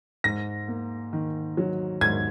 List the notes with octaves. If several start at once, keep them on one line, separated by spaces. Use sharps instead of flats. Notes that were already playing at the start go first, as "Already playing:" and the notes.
G#2 A#6
A#3
D#3
F#3
G#2 G#6